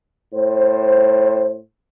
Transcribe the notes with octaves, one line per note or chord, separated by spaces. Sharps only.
A2 C5